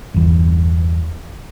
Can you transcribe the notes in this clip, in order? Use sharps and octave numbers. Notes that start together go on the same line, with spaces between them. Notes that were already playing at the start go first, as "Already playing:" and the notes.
G1 E2